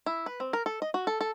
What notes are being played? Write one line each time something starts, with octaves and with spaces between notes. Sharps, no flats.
E4
B4
C4
A#4
A4
D#5
F#4
A4
A4